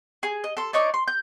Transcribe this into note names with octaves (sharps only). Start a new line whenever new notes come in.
G#4
D#5
A4 C6
D4 D#4 C#5 D5
C6
G6